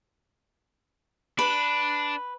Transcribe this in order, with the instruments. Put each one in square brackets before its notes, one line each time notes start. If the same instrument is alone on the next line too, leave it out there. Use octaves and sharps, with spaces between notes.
[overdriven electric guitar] D4 [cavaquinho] B4